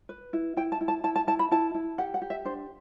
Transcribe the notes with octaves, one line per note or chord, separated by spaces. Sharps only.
B4
E4
E4 G5
A5
E4
A5
E4 A5
A5
E4 A5
B5
E4 A5
E4
G4 F#5
F#5
G4
E5
D4 C5